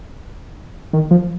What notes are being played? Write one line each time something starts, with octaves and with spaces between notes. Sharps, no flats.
D#3
F3